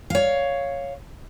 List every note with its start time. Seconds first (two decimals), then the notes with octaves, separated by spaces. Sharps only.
0.10 C#5 F5